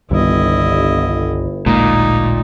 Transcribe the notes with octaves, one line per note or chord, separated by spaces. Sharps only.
G1 C2 G2 D#3 E4 D#5
A1 D2 A#2 G#3 D#4